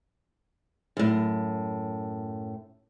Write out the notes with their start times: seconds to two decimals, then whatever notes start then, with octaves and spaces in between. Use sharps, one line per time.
0.97 F#2 A2